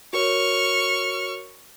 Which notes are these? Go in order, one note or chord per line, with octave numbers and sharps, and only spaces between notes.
F#4 A#4 C#5 C#6 F6